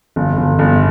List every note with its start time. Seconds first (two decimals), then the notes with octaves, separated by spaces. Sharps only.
0.16 G1
0.37 G1
0.59 G1